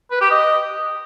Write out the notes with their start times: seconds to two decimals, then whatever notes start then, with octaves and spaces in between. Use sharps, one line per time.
0.11 B4
0.21 G4
0.31 D#5